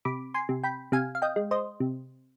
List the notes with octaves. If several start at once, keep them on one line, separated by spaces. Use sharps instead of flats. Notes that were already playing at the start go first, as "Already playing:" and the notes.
C3 B5 D6
G#5 C6
C3
G5 B5
C3 F5 G#5
F5
D#5 G5
G#3
C5 D#5
C3